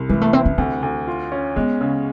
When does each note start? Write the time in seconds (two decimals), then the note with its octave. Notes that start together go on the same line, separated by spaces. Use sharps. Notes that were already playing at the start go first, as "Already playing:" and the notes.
Already playing: C2
0.09 E3 G#3
0.21 A3
0.33 C4 E4
0.46 C#4
0.58 D2 C4
0.83 D2
1.07 F4
1.32 C#4
1.56 G#3 B3
1.81 C#3